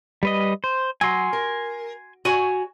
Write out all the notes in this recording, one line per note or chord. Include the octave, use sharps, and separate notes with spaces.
G3 B4 D#5
C5
F#3 G#5 C6
A#4
F#4 C#5 G#5